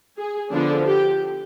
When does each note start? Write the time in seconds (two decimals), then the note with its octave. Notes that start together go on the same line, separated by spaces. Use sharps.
0.17 G#4
0.52 D3 F3 B3 D4
0.88 G4